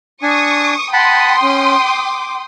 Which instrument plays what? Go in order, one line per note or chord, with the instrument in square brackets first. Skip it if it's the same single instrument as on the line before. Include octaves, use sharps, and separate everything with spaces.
[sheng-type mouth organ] D4 G#5 [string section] C#6 D#6
[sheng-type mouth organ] F#5 A5 B5 [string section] G5 C6 D#6
[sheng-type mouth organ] C#4
D6